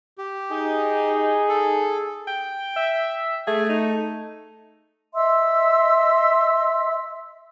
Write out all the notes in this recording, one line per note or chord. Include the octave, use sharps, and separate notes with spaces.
G4
D#4 G#4
A4
G5
E5
A3 G#4
D#4
D#5 E5 C6 E6